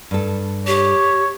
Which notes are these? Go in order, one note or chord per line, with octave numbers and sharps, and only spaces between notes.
G2 A4
G4 C#5